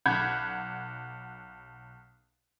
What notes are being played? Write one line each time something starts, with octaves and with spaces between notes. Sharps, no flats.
B1 F#5 B5 G6 G#6